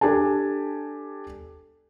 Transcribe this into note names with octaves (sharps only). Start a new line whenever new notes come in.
D4 G4 A4 G#5 A5